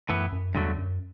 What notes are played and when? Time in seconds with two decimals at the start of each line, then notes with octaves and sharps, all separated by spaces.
0.09 F#2 A2 E3 B3
0.32 F#2
0.55 E2 G2 D3 F#3 A3
0.78 F#2